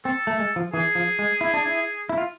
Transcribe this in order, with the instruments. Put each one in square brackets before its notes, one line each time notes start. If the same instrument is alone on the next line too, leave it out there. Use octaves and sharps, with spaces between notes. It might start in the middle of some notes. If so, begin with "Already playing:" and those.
[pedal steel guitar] C4 [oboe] A4
[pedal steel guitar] A3
G#3
F3
[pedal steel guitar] E3 [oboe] G#4
[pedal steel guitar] F3
G#3
E4
D4
E4
E4
F4